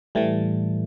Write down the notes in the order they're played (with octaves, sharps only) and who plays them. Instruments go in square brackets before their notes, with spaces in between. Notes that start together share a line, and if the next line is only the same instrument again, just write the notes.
[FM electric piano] A2 E3 G3 A3